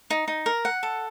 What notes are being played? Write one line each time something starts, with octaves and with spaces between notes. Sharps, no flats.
D#4
D#4
A#4
F#5
A4